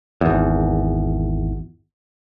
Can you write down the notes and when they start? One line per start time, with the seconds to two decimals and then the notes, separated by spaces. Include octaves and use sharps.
0.21 G#1 E2